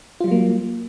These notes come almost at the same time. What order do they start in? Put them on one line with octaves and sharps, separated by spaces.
F4 G3 F#3 A#3